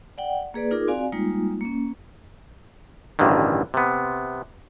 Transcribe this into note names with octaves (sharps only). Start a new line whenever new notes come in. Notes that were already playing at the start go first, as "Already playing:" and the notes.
D5 F#5 G5
A#3 G#4 B4 D5
D#4 F4 G#4 A#4 D6
C4 F#4 D5 F5 G#5
G3 G#3 A#3 D#4 F4
A#3 C#4
A1 D2 G2 D3 D#3
C3 B3